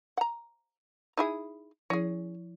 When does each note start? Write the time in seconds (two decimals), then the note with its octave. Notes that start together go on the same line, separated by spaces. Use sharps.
0.17 F#5 A#5
1.17 D#4 E4 G#4
1.90 F3 C#4 E4 G#4